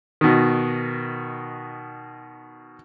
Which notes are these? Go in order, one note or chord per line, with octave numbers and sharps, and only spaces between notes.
B2 D#3